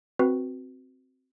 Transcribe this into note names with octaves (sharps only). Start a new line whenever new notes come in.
C4 F#4 B4